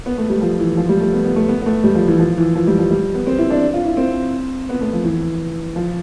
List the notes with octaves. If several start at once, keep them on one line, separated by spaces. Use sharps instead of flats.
B3
A3
G3
F3
E3
F3
G3
A3
B3
B3
A3
B3
B3
A3
G3
F3
E3
F3
E3
F3
G3
F3
G3
B3
C4
E4
D4
F4
E4
C4
B3
A3
F3
E3
F3